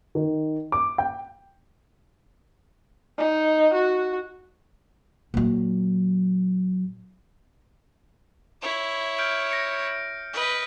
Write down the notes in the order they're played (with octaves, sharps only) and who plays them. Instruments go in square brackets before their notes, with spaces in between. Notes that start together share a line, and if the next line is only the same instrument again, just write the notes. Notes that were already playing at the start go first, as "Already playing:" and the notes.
[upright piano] D#3
D6
G5
[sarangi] D#4
F#4
[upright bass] A#2 F#3
[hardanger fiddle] E4 C#5
[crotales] F6 G6 D7
A#6 C#7 D7
[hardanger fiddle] B4 D#5